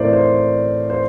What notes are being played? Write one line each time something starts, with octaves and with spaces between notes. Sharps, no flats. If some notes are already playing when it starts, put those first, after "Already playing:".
Already playing: A2 E3 A3 C4 A#4 C5 D5
C5
C5